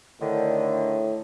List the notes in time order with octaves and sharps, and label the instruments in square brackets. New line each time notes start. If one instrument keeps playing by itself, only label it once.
[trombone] A2 [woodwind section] D3 D#3